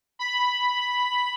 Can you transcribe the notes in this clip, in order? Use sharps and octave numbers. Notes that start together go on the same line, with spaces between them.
B5